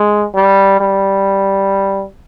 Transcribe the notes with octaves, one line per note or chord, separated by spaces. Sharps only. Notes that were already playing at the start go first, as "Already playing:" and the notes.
Already playing: G#3
G3
G3